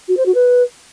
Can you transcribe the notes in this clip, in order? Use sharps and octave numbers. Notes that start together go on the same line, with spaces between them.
F#4
C5
F#4
B4